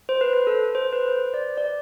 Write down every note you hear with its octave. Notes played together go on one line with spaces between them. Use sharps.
C5
B4
B4
A4
C5
C5
B4
C5
D5
D5